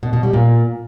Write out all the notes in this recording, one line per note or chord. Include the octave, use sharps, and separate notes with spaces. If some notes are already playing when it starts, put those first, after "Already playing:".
B2
B2
G3
A#2